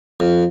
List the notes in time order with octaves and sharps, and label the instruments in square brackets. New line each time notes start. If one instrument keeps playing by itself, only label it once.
[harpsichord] F2